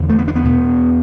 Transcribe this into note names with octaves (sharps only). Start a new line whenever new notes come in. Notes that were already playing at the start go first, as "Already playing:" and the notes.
Already playing: E2 D3
A3
B3
D4
B3
E2 B2